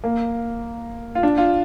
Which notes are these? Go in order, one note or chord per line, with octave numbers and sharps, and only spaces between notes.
A#3
F4
D4
F4